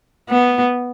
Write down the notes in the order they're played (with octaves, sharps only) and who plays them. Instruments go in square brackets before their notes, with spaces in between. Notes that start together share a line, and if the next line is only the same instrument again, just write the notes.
[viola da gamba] B3